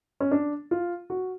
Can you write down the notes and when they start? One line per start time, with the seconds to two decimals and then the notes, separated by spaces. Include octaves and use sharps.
0.20 C#4
0.31 D4
0.71 F4
1.10 F#4